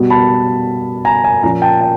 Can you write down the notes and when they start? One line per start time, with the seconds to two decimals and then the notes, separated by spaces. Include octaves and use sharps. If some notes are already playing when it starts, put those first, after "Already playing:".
Already playing: B2 G3 B3
0.10 A5 B5
1.05 G#5 A#5
1.24 G#5 A#5
1.43 A#2 F3 A#3 C#4 G#5 A#5
1.62 G5 A5
1.81 G5 A5